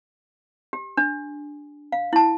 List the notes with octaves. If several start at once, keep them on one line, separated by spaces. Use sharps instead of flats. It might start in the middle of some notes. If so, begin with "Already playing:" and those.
G4
D4
F5
E4 A5